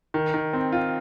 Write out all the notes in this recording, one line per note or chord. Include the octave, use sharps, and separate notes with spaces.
D#3
D#3
C4
F4